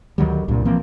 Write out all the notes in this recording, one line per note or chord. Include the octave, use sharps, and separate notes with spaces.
D2 D#3 F#3 G3
C2 G2 A#2
E3 F3 A#3 C4